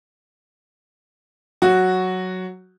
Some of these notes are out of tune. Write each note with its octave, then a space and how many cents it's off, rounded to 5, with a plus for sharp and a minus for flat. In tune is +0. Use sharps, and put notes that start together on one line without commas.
F#3 +0 F#4 +0